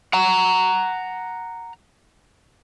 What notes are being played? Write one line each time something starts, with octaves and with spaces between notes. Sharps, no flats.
F#5 A#5